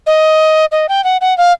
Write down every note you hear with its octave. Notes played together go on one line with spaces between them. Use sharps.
D#5
D#5
G5
F#5
F#5
F5